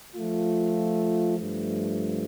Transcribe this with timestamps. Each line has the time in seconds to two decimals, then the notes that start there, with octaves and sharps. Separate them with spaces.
0.16 F3 A3 F4
1.37 G2 F3 A3